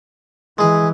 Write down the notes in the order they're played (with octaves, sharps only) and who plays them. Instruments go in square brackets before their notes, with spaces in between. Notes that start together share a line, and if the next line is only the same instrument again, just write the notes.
[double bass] E3 [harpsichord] G#3 G#4